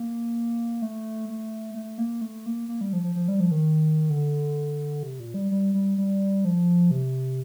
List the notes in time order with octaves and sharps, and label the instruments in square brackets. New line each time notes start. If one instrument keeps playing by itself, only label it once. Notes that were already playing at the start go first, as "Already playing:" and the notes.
Already playing: [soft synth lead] A#3
A3
A3
A3
A#3
A3
A#3
A#3
G3
F3
F3
F3
G3
F3
D#3
D3
C3
A#2
G3
G3
G3
G3
F3
C3